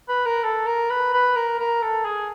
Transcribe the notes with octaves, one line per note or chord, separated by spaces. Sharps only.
B4
A#4
A4
A#4
B4
B4
A#4
A#4
A4
G#4